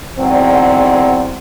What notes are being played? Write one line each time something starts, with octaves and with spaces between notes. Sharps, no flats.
E2 G#2 D3 F#3 C4